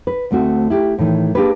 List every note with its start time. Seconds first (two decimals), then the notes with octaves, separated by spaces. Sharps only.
0.07 B4
0.31 D2 A3 C4 F#4
0.70 E4 G4
0.99 A2 D#3 E3
1.35 A#3 D4 G4 G#4 B4